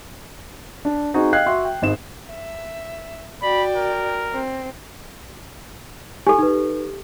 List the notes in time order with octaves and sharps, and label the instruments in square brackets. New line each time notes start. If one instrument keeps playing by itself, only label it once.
[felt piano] D4
C4 D#4 F#4 G#4
D#5 F5 G5 F#6 G#6 C7
F#4 E5 C6
G5
G#1 G#2 E7
[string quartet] E5
[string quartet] F#4 D5 G5 [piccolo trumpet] B5
[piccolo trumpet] A#4
[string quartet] C4
[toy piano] G4 A4 [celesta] G#5
[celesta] D#4 B4